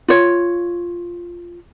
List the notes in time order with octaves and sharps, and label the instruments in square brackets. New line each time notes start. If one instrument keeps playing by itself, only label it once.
[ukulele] F4 C#5